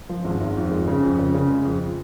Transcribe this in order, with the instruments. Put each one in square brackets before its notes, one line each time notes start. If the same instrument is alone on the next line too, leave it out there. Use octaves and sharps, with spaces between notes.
[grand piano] F3
G#1
G#1
F2
G#3
C#3
F2
C#3
C#3
G#3
F2